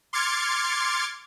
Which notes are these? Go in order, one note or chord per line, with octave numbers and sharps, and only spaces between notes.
C6 D6 F6 G#6 A6 C#7